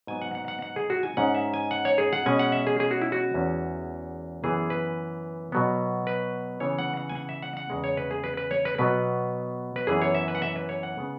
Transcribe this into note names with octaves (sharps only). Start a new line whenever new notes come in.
G#2 F#3 B3 G#5
F#5
F#5
F#5
F#5
G#4
F#4
G#5
G#2 G#3 C#4 F#5
E5
G#5
F#5
C#5
G#4
F#5
B2 G#3 C#4 G#5
F#5
E5
G#4
G#4
F#4
E4
F#4
E2 E3 G#3 C#4
F#2 E3 B3 G#4
B4
B2 F#3 B3
B4
C#3 E3 B3 C#5
F#5
F#5
G#5
F#5
E5
F#5
F#5
E2 C#3 G#3
C#5
B4
G#4
B4
B4
C#5
B4
B2 F#3 B3 B4
B4
F#2 E3 B3 G#4
C#5
E5
B4
F#5
E5
B4
C#5
F#5
C#3 G#3 B3